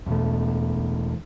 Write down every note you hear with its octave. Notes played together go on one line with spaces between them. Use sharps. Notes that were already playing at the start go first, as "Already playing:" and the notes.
E2 B2 A3